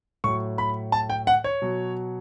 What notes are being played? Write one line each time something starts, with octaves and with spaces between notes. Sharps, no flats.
A2 F#3 C#6
B5
A5
G5
F#5
C#5
B2 F#3